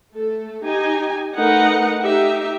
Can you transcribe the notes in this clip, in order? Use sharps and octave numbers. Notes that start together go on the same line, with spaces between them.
A3 A4
D#4 G4 G#5
A3 D#4 A#4 B4 F#5
D#4 G4 E5